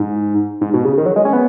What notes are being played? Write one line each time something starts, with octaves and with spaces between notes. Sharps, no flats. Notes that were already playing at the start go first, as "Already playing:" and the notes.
Already playing: G#2
G#2
B2
C#3
D#3
F#3
G#3
C#4
B3